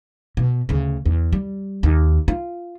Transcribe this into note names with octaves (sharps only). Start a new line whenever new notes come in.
B2
D2 C#3
E2
G3
D#2 D#3
F4